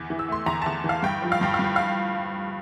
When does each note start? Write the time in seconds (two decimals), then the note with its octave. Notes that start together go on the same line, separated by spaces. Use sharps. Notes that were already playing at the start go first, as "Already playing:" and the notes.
Already playing: E2
0.10 E3
0.19 E6
0.28 A3 C6
0.46 E2 A#5
0.62 A5
0.66 E2
0.84 E3
0.89 F5
1.03 G2 G5
1.22 F3
1.32 F5
1.41 G2 G5
1.54 F5
1.59 G2
1.64 G5
1.76 F5